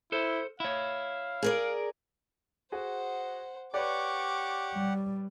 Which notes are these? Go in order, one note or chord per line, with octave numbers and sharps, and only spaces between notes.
E4 A4 C5
E4 C#5 F5
G#4 A#4 D5
F#4 G#4 C5 F#5
G4 B4 C#5 D5 F#5 C#6 D6
G3